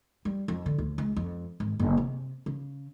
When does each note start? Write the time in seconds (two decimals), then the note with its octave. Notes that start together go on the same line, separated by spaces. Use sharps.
0.25 G3
0.48 F2
0.66 D3
0.78 D2
0.98 C#2
1.16 F2
1.60 G#1
1.80 F#1
1.97 C3
2.46 C#3